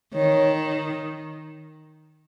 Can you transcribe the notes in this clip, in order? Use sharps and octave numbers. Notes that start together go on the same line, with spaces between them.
D#3 C#5